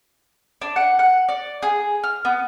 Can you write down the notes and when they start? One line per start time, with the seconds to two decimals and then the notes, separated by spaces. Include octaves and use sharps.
0.62 D4
0.76 F#5
0.99 F#5
1.28 D5
1.63 G#4
2.04 F6
2.25 B3